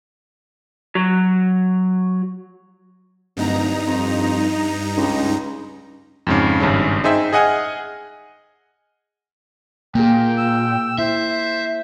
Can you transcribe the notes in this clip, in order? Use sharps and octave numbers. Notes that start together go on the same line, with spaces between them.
F#3
D1 G2 D#4 A#5
F2
C#2
F2 G#2 C#3
G#1 G2 C#3 C#4
D#4 G#4 C5 E5 G5
G#4 D#5 F#5 G#5 F6
A#2 A#3 G#4 G5
E6
E4 C5 E5